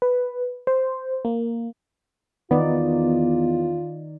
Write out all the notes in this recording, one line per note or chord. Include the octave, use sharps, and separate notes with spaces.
B4
C5
A#3
E2 D#3 B3 D#4 F4 D5